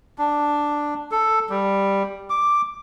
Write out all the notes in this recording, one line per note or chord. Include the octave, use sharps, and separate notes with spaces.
D4
A4
G3
D6